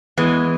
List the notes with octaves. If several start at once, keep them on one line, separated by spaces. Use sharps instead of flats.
E3 G#3 B3